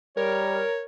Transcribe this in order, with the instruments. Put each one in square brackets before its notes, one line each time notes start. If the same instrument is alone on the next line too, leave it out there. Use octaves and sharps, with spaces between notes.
[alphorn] G3 [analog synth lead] A#4 [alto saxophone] C#5